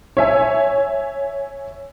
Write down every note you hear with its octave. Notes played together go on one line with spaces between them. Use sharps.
C#5 E5 G#5